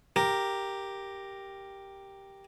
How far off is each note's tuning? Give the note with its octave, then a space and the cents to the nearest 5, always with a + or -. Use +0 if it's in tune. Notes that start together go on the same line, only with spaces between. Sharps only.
G4 +0 A#4 +0